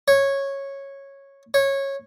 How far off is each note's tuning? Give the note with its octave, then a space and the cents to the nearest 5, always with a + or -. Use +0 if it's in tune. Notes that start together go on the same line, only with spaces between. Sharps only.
C#5 -10
C#5 -15